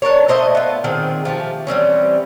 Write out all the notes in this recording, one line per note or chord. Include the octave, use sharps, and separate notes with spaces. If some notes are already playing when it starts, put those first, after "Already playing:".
D4 A4 A#4 C#5
A3 C5 D#5 E5
B3 F4
A#2 D#3 C4 G#4
F3 A3 G4
E3 G3 C4 C#4